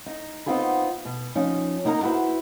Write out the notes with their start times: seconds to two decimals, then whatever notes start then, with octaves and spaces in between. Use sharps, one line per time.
0.06 D#4
0.46 B3 C4 D#4 F4 G#4 B4
1.05 B2
1.35 F3 C#4 D#4
1.85 A#3 D#4 E4 A#4 A#5
2.02 E4 F#4 A4 B4 C5